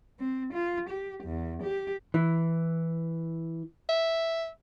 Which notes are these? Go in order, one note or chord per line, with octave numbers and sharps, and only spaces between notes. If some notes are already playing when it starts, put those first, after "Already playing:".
C4
F4
G4
E2
G4
E3
E5